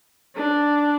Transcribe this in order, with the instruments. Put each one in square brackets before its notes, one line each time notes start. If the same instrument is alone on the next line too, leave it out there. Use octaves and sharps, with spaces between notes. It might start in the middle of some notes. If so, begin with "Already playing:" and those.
[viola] D4